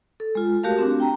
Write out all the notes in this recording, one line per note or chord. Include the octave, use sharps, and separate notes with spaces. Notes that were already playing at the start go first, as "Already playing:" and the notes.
A4
G#3 F4
A3 F#4 G4 A#4 F5 A5
C4 D4
G5 A#5